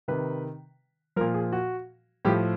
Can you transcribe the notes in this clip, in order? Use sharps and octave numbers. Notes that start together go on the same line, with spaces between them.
C3 D#3 B4
A#2 F3 A#4
G#4
F#4
A2 F3 G4